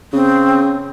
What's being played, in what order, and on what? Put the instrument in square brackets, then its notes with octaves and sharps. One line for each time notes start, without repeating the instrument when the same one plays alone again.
[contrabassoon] C#3 [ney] C4